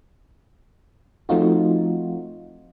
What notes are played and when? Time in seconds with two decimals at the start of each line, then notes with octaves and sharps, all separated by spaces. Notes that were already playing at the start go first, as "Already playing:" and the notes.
1.29 F3 A3 C4 D#4 F4 F#4